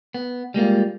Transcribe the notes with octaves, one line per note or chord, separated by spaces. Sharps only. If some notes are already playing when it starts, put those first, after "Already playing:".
B3
G3 G#3 A#3 F4